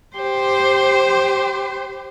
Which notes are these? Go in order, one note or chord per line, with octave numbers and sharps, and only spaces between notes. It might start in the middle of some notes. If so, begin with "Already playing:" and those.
G4 C5